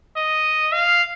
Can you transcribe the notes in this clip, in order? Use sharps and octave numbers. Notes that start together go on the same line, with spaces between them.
D#5
F5